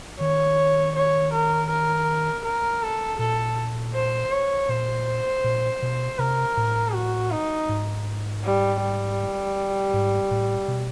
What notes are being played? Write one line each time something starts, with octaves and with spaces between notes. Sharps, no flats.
D#3 C#5
C#5
A#4
A#4
A#4
A4
A#2 A4
C5
C#5
A#2 C5
A#2
B2
C3 A#4
A2
F#4
D#4
G#2
G3
G3
G#2
A2
B2